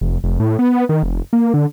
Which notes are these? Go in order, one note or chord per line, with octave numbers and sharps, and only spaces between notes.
F1
F1
A2
B3
D#3
F1
A#3
D3